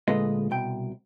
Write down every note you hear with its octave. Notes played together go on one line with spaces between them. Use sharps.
D2 A#2 G#3 A4 B4 D#5
C2 B2 G5